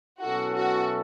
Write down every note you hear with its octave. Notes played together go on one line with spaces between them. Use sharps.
B2 F#3 C#4 E4 F#4 A4
F#4